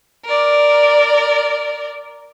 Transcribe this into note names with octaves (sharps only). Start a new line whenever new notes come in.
A#4 D5